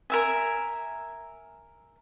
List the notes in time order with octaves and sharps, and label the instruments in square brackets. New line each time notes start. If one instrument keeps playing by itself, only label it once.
[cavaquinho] A#4 E5 G#5